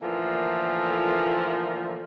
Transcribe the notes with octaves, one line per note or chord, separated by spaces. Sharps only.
A#2 D3 E3 F3 A3 A#3